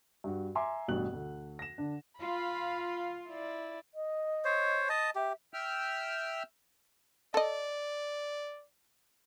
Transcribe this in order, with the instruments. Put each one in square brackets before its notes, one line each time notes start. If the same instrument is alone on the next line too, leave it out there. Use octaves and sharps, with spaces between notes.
[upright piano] G2 F#4
E5 G#5 A#5 C6 D6
A1 G2 B2 F#6 F#7
D2
A#6 E7
D3 D4
[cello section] F4 [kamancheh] F5 B5
[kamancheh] E4 D5
[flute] D#5
[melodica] C5 C#5
D#5 A5
[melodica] G4 [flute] E5
[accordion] E5 G5 F6
[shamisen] A4 D#5 [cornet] D5